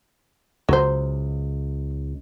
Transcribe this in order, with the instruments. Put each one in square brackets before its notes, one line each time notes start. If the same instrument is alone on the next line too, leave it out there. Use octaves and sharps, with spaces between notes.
[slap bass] C#2 [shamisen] F#3 C5